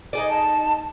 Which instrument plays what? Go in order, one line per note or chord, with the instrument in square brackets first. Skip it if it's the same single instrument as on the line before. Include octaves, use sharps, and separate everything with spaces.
[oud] D#4 G#4 D5
[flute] A5